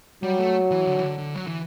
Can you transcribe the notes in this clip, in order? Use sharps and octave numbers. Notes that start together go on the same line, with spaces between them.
F#3 G3
A3
E3
D3
E3
D3
D3
F#3
E3